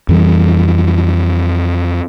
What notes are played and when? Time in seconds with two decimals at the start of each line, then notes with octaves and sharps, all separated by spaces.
0.09 F2 E3 G3